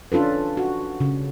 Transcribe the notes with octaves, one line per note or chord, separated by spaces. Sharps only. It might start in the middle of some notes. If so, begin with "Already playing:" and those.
C#4 D4 F4 A4 B4
F#4
C#3